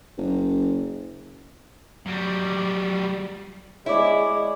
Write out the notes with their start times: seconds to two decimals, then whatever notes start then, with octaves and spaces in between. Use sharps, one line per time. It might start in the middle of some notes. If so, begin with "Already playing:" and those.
0.18 F#1
2.06 F#3 G3
3.86 G#3 E4 C#5 D5